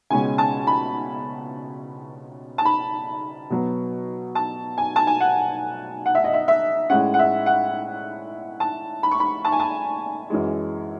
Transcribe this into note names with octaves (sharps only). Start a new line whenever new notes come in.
C#2 B2 G#3 C#4 G#5
A5
B5
A5
B5
B2 F#3 B3
A5
G#5
A5
G#5
F#5
F#5
E5
D#5
E5
E5
A2 G#3 C#4 F#5
F#5
E5
F#5
A5
B5
C#6
B5
A5
G#5
A5
F#2 E3 G#3